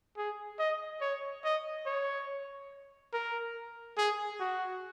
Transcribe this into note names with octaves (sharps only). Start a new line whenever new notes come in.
G#4
D#5
C#5
D#5
C#5
A#4
G#4
F#4